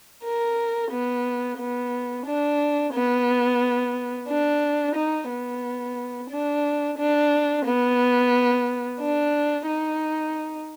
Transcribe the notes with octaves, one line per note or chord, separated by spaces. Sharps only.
A#4
B3
B3
D4
B3
D4
D#4
B3
D4
D4
B3
D4
D#4